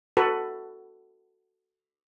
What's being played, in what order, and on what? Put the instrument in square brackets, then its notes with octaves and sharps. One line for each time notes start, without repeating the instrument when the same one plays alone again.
[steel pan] F#4 A4 B4